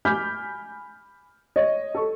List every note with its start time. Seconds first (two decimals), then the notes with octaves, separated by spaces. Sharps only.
0.05 G#5 B5 D6 F6 G6 B6
1.56 C#5 D#5
1.95 A4 C#6